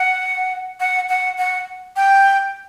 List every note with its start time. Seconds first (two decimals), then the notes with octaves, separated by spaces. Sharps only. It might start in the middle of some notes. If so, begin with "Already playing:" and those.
Already playing: F#5
0.80 F#5
1.09 F#5
1.38 F#5
1.96 G5